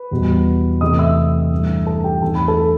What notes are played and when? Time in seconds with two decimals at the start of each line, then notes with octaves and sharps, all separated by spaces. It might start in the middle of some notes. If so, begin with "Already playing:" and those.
Already playing: B4
0.11 E2 B2 G3
0.81 E2 C3 E3 A3 C4 D#5 D#6
0.99 E5 E6
1.52 G2 E3 A3
1.87 A4 A5
2.04 G4 G5
2.22 E2 D#3 A3 C4 A5
2.35 B5
2.48 A4 A5